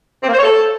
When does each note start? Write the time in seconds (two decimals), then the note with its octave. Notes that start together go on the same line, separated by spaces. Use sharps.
0.23 C4
0.28 A#3
0.33 C5
0.38 C#5
0.43 A4